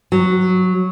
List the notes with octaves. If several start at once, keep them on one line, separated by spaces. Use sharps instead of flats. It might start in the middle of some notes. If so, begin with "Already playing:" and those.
F#3